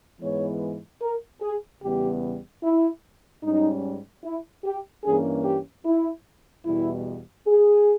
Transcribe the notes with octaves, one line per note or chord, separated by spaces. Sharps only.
G#2 E3 G#3 B3 C#5
A#4
G#4
E2 C#3 G3 B3 G4
E4
G#2 G3 C#4 D#4
E4
G4
G2 E3 A#3 C#4 G#4
G4
E4
E2 B2 G3 E4
G#4